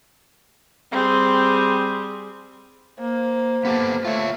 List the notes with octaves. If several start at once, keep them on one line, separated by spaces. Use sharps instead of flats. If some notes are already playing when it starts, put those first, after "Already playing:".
G3 C4 G#4
A#3 C5
A#3 B3 G4 A4
A3 F4 C#5